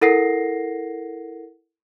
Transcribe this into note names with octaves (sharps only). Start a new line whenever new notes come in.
E4 A4 A#4 F#5 A#6 C7